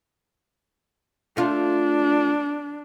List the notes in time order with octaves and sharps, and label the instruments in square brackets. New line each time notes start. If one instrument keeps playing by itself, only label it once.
[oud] A3 F4 [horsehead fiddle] D4